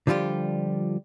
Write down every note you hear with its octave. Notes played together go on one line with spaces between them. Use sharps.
D3 F3 G3 F4 G4